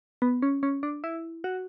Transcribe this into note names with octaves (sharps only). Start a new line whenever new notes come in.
B3
C#4
C#4
D4
E4
F#4